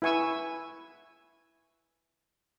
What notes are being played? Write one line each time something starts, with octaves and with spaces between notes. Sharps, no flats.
E4 B4 G#5 C#6 E6